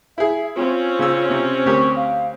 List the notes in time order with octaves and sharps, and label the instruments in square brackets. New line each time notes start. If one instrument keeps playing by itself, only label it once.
[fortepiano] E4 G#4 [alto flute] E5
[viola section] C4 C#4 [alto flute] F4
[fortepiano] C#3 E6
C3
[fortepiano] D2 G4 A#4 [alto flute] C#6
[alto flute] F5